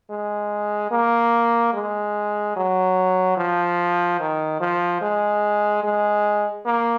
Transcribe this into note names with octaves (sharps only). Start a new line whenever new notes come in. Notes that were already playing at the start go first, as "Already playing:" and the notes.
G#3
A#3
G#3
F#3
F3
D#3
F3
G#3
G#3
A#3